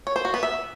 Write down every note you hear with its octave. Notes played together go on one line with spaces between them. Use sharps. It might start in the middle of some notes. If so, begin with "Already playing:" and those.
C#5
C5
F#4
B3
E5